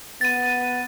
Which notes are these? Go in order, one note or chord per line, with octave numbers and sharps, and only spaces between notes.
B3 A6 D#7